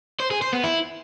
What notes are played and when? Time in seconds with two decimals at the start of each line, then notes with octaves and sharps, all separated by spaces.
0.20 C5
0.31 G#4
0.42 C5
0.53 B3
0.64 E4